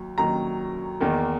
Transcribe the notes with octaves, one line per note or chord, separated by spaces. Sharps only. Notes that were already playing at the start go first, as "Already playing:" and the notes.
Already playing: D#2 F#3
D#2 D#3 F#3 A#5
E2 D#3 A#3